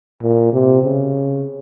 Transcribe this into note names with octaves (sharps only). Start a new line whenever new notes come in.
A#2
C3
C#3